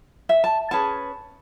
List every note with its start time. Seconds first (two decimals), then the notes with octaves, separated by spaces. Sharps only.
0.29 E5
0.44 A5
0.71 C#4 G#4 B4 A5